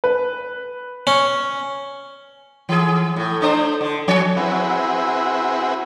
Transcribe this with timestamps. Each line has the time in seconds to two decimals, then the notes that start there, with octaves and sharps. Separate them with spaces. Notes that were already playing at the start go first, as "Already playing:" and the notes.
0.04 B4
1.07 C#4
2.69 E3 G#4
3.16 A2
3.41 A3 D4 C5
3.81 D3
4.08 F3 C#4 C#5
4.37 C4 E4 F#4 G#4 B4